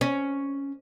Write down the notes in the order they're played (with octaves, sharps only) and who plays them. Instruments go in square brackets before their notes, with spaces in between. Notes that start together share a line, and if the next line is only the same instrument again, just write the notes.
[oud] C#4